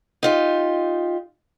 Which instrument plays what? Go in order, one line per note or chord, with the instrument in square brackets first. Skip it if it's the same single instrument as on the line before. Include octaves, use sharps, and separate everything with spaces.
[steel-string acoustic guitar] D#4 F4 G4